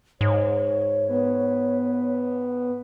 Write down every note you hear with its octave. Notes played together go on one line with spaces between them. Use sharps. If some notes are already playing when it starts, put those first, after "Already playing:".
G#2 C#5
B3